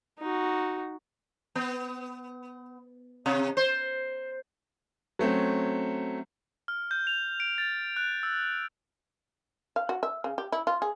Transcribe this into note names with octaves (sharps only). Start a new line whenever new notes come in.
D#4 F#4
B3
C3
C5
F#3 A3 C4 C#4
F6
G6
F7
D7
A6
F#6
E6
F5
F#4
E5
C#3
G4
E4
F4
G#4